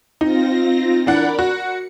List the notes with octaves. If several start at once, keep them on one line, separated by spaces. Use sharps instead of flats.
C4 D#4 F4 A#6
E3 D4 A#4 D5 F#5 B5
F#4 C#7